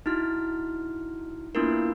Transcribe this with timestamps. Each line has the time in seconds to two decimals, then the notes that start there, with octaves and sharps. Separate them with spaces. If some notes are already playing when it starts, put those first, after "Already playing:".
0.06 D#4 E4 F#4 F6
1.55 A#3 B3 D4 E4 F4 A#4